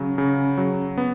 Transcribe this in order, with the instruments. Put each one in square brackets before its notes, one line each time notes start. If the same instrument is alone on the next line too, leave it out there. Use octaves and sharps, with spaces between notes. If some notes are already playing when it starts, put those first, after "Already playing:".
Already playing: [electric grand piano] C#3 F#3 [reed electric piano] C#4
[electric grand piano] C#3
F#3
B3